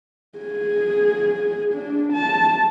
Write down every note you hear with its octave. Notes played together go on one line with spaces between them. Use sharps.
G#4
D4
A5